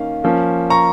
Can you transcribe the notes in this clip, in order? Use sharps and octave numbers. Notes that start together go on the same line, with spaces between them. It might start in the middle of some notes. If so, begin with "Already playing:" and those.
Already playing: D#3 A#3 C#4 F5
F3 A#3 C#4
A#5 C#6